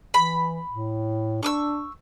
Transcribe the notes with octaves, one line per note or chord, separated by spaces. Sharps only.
E3 B5
A2
D4 C#6 D6 E6